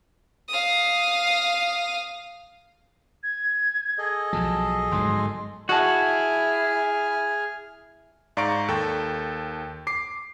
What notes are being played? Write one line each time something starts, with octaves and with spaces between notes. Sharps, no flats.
F5 D#6
G#6
G#4 A4 D#5
B1 F3 F#3 A5
G1 G#2 F#3 C6
E4 F#4 G#4 D#5 G#5 A5 F6
G#2 D5 F5 A#5 C#6 D7
D#2 A4 G5
D6 C7